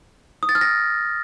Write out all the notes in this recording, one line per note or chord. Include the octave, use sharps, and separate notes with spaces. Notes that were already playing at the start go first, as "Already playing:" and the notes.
D#6
A6
F6
A#6